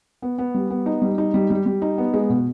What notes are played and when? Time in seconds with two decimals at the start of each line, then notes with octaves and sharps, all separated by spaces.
0.22 B3
0.38 B3
0.55 G3
0.70 B3
0.86 D#4
1.02 G3
1.18 D#4
1.34 G3
1.50 G3
1.66 G3
1.82 D#4
1.98 B3
2.14 G#3
2.29 B2